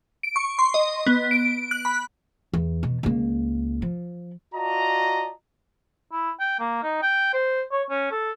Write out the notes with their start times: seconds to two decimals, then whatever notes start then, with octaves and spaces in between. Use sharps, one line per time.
0.23 D7
0.36 C#6
0.59 C6
0.74 D#5
1.06 B3
1.31 D7
1.71 F#6
1.85 B5
2.54 E2
2.83 B2
3.03 C#2 A#3
3.82 F3
4.54 F4 F#4 D5 D#5 A5 A#5
6.12 E4
6.40 G5
6.60 A#3
6.83 D#4
7.03 G5
7.33 C5
7.72 C#5
7.90 C#4
8.11 A4